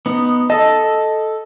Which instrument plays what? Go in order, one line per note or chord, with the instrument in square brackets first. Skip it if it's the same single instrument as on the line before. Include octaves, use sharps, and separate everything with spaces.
[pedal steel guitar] B3 D#4
[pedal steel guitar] A4 A5 [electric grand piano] D#5